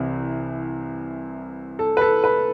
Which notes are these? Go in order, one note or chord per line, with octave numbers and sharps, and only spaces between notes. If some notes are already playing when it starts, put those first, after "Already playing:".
Already playing: C2 C3 E3
A4
B4
A4
B4